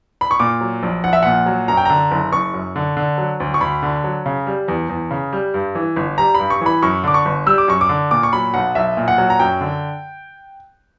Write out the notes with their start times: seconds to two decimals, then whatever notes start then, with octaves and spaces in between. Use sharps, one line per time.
0.21 B5
0.31 C#6
0.40 A#2 D6
0.61 F#3
0.83 A#1
1.04 A#1 F#5
1.13 E5
1.23 A#2 F#5
1.46 F#3
1.68 F#2 A#5
1.77 G5
1.85 D3 A#5
2.11 F#1
2.32 F#1 C#6
2.54 F#2
2.76 D3
2.97 D3
3.18 F#3
3.40 D2
3.54 C#6
3.61 D2 B5
3.83 D3
4.04 F#3
4.26 C#3
4.47 G3
4.68 E2
4.89 E2
5.11 C#3
5.33 G3
5.54 G2
5.75 E3
5.96 G1
6.18 G3 A#5
6.35 G2 B5
6.50 C#6
6.61 E3 B5
6.82 F#2 C#6
7.04 D3 D6
7.14 C#6
7.25 G1
7.46 G3 E6
7.58 D6
7.68 F#2 C#6
7.81 D6
7.89 D3
8.11 A#2 D6
8.23 C#6
8.33 F#3 B5
8.54 B1 F#5
8.75 B1 E5
8.97 A#2
9.08 F#5
9.18 F#3
9.30 A#5
9.40 F#2 G5
9.61 D3